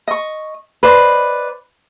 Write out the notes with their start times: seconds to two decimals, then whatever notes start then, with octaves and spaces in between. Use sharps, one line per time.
0.08 D#5 C#6
0.83 B4 C5 D5 D#5